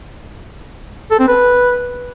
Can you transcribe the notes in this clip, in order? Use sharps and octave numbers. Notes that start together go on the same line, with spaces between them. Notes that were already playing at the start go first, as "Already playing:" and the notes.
A4
C4
B4